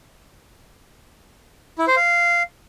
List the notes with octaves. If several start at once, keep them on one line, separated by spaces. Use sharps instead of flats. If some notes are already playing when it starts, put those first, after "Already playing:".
E4
C5
F5